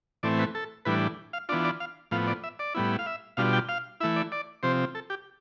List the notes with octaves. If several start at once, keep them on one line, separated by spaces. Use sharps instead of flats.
A2 E3 A3 C4 D5
B4
A4
A2 E3 G3 D4 B4
F5
E3 B3 D4 F4 D5
D5
F5
A2 F3 B3 F5
D5
E5
D5
A2 G3 B3 E4
F5
E5
B2 G3 D4 F4 F5
G5
F5
E3 A3 E4 E5
D5
D5
C3 F3 C4 C5
A4
G4